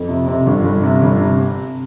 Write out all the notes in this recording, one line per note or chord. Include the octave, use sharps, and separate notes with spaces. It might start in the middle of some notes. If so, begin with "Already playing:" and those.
Already playing: F2
C3
C3
G1
G1
C3
G1
C3